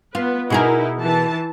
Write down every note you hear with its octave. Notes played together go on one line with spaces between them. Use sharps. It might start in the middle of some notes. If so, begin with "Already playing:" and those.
B3 F4 B4
B2 D#4 E4 G#4 A#4
E3 A5